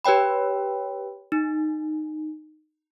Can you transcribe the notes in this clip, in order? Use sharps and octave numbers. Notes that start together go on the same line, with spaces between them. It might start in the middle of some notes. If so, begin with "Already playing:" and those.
G4 B4 C#5 G5 B5
D#4